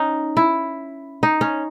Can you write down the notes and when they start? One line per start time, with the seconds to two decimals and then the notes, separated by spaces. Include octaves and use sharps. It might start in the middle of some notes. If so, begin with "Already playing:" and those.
Already playing: C#4 D#4
0.37 E4
1.23 D#4
1.41 C#4